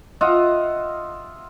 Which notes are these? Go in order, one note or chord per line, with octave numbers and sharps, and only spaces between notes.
F4 D#5 E5 F#5